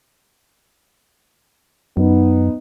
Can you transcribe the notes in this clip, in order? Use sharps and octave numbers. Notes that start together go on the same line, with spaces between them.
F#2 B3 D#4